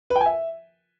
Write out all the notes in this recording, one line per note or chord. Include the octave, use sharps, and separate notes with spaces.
B4
G5
G#5
E5